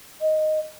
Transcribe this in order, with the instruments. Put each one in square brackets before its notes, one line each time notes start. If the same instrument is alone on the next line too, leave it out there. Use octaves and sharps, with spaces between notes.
[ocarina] D#5